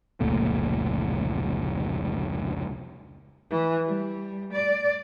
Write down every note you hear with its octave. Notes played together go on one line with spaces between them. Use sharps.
F1 C#2 A#2 A3
E3
G3
D5